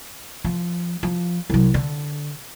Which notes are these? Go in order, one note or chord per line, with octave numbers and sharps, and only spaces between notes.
F3
F3
C2 F#3
D3